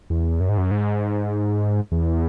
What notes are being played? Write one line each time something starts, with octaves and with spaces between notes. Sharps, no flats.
E2
F#2
G#2
F#2
G#2
E2